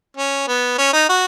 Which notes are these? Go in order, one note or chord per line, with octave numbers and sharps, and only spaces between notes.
C#4
B3
C#4
D#4
F#4